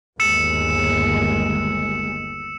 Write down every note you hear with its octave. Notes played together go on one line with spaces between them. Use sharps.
G1 D#2 G#3 E6 C#7 E7